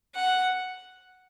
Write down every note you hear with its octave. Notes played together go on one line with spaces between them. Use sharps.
F#5